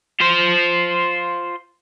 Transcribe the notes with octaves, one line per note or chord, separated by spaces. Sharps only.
F4 C5